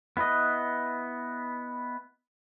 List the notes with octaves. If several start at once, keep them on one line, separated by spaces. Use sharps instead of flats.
B3 E4 B4 D#5